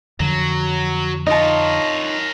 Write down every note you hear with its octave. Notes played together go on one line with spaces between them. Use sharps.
F2 D3 F#3
D#4 F4 A#4 C#5 D#5 A5